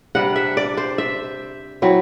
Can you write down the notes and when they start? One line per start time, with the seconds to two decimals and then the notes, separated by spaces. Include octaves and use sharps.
0.15 C3 G3 D4 F#5
0.36 E5
0.57 D5
0.77 C5
0.98 E5
1.82 F#3 C4 E4